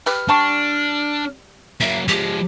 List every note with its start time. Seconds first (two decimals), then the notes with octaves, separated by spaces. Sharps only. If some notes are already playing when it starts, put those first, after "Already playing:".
0.06 G4 B4 F6
0.29 G3 D4 A5 C#6
1.81 F#3 A#3 E5
2.08 F3 G#3 G4